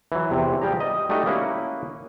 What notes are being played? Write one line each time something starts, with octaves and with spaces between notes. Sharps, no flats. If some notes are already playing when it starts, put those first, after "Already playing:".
E3 F#3
E2 C3
F3 G3 G4 G#4 A#5
D#5
G3 A3 D#4 F#4 D#5
A#3 C#4 E4 F#5